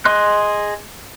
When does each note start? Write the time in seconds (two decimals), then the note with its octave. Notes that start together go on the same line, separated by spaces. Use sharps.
0.05 G#4 D#5 C6 F#6